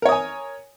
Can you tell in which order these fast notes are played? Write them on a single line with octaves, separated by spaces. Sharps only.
A#4 C#5 D#6 G#5